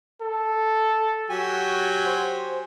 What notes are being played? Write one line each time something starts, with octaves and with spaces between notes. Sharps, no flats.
A4
F#3 F#4 G4 G#5
C5